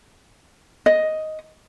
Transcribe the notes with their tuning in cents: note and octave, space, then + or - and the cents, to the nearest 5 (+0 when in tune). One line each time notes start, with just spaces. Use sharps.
D#5 +5